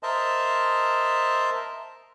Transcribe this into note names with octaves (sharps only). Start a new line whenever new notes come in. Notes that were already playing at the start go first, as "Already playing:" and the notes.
A#4 C5 D#5 E5 A5